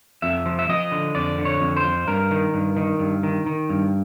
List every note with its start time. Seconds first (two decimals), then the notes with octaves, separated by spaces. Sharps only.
0.22 F2 E5
0.46 F3
0.59 E5
0.69 F3 D#5
0.92 D3
1.15 F2 D5
1.39 D3
1.45 C#5
1.61 F2
1.77 C5
1.84 F2
2.07 G2 A#4
2.31 D#3
2.54 G2
2.77 D#3
2.99 G2
3.23 D#3
3.46 D#3
3.70 G2